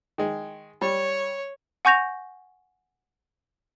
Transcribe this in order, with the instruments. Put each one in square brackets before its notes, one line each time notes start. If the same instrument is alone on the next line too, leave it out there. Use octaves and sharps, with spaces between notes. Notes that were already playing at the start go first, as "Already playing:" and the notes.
[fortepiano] D#3 G#3
[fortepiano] G3 [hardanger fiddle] C#5
[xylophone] F#5 G#5 C#6 G6 A#6 F7